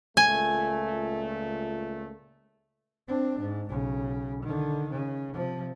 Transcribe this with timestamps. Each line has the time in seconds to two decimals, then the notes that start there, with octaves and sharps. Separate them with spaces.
0.17 C#2 A#2 A3 G#5
3.08 C4 D4
3.39 G#2
3.69 B1 C#3
4.43 D3 D#3
4.90 C#3
5.33 C3 F3